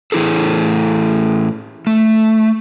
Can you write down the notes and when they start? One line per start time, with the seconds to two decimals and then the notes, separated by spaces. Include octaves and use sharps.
0.12 A2 E3 E4 G#4 A4
1.87 A3